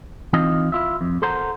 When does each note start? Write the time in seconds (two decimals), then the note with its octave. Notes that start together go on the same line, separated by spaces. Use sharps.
0.33 E3 C4 D#4 F4 D#5
0.72 E4 F4 E5
1.01 F2
1.22 A4 A#4 C5 F#5 A#5